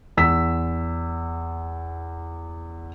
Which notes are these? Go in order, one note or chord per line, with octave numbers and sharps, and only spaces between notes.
E2 E6 B6